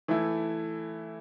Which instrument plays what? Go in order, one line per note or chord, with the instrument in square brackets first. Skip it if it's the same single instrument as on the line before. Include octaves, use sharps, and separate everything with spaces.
[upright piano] E3 A3 E4